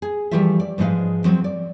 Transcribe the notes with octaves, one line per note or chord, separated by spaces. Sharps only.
G#4
E3 F3 G3 A3 F4 E5
D5
G#2 F3 G#3 D#4 B4 F5
F3 F#3 C4
D5